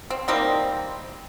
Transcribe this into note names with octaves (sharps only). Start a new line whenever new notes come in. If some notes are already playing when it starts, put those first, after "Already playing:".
C4
D#3 G3 A#3 C4